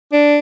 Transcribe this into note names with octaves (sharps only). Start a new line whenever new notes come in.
D4